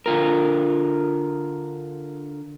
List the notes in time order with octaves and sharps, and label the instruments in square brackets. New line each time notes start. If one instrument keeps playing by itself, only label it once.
[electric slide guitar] D3 F4 A#4